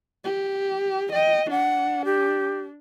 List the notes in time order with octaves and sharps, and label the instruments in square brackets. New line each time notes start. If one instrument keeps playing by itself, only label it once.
[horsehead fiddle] G4
[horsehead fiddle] D#5 [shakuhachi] G5
[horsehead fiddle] D4 [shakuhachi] F#5
[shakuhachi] G4